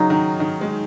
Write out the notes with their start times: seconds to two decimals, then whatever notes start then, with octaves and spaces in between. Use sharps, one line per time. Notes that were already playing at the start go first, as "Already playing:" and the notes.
Already playing: C#3 F#3 D#4
0.10 D#3
0.40 D#3
0.61 G#3